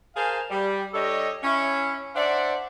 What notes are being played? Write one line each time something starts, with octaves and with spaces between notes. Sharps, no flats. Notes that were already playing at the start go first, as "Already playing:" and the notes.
G#4 A#4 C5 F5 G#5 A5
G3
G3 D4 A4 C#5 D#5
C#4 E4
D4 C5 D5 E5 F#5